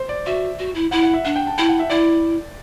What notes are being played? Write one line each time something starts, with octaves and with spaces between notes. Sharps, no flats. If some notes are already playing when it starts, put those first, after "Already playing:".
Already playing: C5
D5
F#4 E5
F#4
E4
E4 F#5
F#5
E5
D4 F#5
G5
A5
E4 G5
F#5
E5
E4 D5